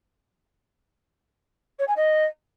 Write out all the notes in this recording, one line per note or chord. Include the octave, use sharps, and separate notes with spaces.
C#5
G#5
D#5